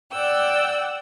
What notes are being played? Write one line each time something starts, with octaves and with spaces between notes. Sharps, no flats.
D5 F#5 G5 E6